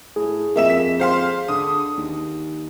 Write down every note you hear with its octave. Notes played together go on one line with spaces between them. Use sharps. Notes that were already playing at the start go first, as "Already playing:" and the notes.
A2 G#4
F2 A#3 E5 E7
B6
C5 F5 C6
D3 D#6
D#2